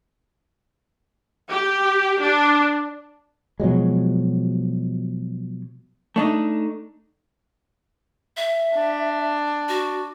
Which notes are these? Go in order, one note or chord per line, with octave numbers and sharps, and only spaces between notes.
G4
D4
B2 F3 F#3 G#3
A3 D4 D#4
E5
D4
F#4